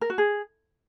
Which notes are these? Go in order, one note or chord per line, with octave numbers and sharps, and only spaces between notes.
A#4
F#4
G#4